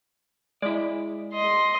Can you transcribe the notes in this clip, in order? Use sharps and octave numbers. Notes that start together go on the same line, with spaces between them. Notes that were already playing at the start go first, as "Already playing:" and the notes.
G#3 E4 D5
D#5 C6